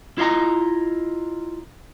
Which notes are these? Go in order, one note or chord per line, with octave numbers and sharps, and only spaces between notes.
E4 F4 D#5 A#5